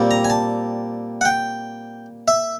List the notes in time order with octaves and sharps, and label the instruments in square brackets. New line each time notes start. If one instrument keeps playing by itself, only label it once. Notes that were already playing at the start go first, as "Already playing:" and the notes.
Already playing: [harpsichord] A#2 G3 C4
A#5
G#5
A5
F#5
G5
E5